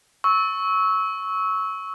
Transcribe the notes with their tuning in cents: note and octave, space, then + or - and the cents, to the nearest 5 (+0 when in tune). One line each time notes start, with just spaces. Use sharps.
C#6 +0 E6 -20